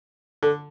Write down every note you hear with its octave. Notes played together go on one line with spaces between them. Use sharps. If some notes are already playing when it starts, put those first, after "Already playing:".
D3